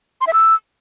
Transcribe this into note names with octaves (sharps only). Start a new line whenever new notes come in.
C6
E5
E6